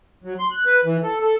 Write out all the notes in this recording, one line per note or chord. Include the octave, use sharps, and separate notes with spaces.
F#3
C6
F#6
B4
E3
A4
A4